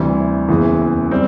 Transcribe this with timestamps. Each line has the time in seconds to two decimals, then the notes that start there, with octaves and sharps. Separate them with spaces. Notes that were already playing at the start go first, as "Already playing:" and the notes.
Already playing: D2 C3 E3 G3
0.48 F#1 E2 C#3 E3
1.11 G3 C4